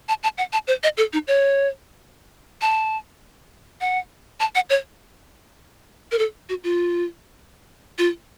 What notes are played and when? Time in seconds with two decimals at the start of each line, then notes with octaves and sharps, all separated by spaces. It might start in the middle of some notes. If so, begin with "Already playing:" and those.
0.09 A5
0.23 A5
0.38 F#5
0.53 A5
0.68 C5
0.83 D#5
0.97 A4
1.13 D#4
1.27 C#5
2.61 A5
3.81 F#5
4.40 A5
4.55 F#5
4.70 C#5
6.12 A#4
6.19 A4
6.49 F#4
6.64 F4
7.98 F4